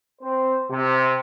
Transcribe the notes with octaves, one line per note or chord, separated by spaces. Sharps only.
C4 C5
C3